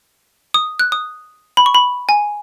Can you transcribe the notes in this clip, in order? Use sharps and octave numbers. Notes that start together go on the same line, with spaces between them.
D#6
F#6
D#6
B5
C#6
B5
G#5